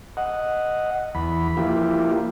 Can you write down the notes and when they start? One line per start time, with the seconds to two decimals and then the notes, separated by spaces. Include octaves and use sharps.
0.17 D#5 F#5
1.15 E2 B5
1.57 F3 A#3 E4 F4 G4